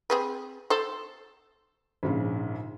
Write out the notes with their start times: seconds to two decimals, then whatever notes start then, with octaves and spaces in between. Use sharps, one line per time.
0.10 C4 G#4 B4
0.70 A4 C5
2.03 A#1 G#2 C#3